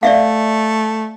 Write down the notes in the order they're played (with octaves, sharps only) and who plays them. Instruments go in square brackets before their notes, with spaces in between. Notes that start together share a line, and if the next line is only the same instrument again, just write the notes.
[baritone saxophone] A3 [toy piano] D5 E5 F5